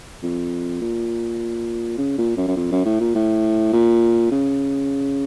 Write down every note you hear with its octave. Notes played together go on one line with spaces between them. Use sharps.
F2
A#2
C#3
A#2
F#2
F#2
F2
F#2
A2
A#2
A2
A#2
C#3